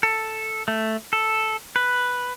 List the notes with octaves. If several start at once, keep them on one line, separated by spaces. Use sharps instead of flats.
A4
A3
A4
B4